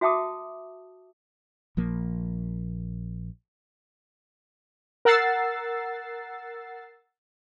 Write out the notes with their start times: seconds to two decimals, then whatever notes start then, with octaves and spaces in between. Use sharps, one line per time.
0.01 F#4 E5 G5 A5 D6 D#6
1.77 A#1 F3 A#3
5.05 A#4 F#5 E6 A6 C7